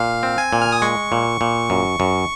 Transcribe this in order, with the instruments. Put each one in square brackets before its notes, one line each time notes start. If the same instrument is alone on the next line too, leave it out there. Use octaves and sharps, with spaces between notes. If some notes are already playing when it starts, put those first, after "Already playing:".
Already playing: [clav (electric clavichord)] A#2 [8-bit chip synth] F5
[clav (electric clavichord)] C4
[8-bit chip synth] G#5
[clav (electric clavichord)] A#2
[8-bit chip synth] F6
D#6
[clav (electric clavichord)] G#3 [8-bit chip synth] C#6
[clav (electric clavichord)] A#2
A#2
F#2
F#2